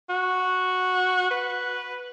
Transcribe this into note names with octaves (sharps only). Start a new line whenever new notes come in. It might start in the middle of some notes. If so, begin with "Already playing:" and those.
F#4
B4